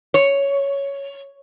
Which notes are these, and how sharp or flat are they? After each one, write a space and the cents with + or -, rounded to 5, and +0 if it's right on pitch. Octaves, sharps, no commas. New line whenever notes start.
C#5 +5